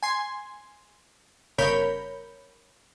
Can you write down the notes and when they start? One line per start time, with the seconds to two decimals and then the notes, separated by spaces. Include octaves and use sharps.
0.03 G#5 C6
1.58 G1 C#3 A#4 C#5 B5 G6